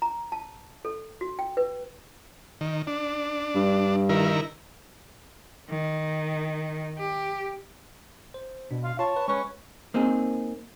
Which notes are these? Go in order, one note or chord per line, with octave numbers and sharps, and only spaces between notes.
A#5
A5
A4
F#4
G5
B4
D#3
D4
G2
D#3 E4 A#4
D#3
G4
C5
B2 D4
F5
F4 C#5 A5
B4
G#3 C#4 B4 C#6
A#3 C4 D#4 G#4